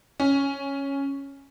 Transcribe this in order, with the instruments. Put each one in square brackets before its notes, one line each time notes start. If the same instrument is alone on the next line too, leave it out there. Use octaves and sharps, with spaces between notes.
[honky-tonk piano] C#4